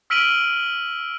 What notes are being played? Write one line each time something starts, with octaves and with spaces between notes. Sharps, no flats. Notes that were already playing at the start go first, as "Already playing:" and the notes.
E6 F6 B6 D7 D#7 F#7